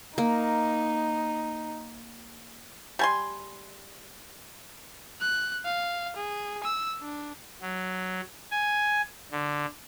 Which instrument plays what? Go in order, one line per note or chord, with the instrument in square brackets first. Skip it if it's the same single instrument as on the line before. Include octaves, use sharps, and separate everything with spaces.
[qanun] A#3 [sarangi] D#4
[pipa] G3 G#5 C6
[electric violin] F#6
F5
G#4
E6
D4
[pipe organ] F#3
G#5
D3